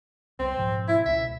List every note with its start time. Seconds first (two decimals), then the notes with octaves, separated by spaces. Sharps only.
0.39 C2 C4
0.57 G#2 B2 F3
0.88 E4
1.06 C#2 B2 E5